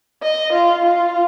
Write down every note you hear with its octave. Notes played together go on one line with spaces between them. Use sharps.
D#5
F4
F4